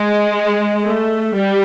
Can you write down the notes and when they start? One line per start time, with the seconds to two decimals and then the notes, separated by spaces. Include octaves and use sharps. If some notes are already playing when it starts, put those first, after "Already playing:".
Already playing: G#3
0.84 A3
1.35 G3